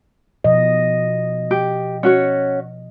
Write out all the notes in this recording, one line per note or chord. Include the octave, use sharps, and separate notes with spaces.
B2 F3 D#5
G4
C#4 F#4 C#5